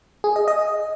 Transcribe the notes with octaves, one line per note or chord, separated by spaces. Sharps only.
G#4
D#5
D#5